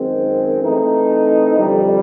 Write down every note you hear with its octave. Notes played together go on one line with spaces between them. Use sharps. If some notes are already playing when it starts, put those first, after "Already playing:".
Already playing: F#2 D#3 G#3 C4
E3 A3 C4 D#4
F2 D3 G3